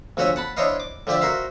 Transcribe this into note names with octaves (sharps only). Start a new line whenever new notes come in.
D2 F3 F#4 C#5 E5 G#5
F#5 A5 B5
D4 E4 C5 C#5 D#5 F5
D6
D3 F3 G4 D5 E5
F#4 A#4 C5 E5 F5